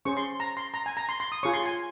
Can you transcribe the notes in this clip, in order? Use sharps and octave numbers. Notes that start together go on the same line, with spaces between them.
C#4 G#4 C5 C#6
C6
A#5
C6
A#5
G#5
A#5
C6
C6
D#6
F4 G#4 C#5 C#6
C6
G#5